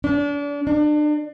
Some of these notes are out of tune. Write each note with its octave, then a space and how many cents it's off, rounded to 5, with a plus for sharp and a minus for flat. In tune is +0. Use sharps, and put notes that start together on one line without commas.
D4 -35
D4 +35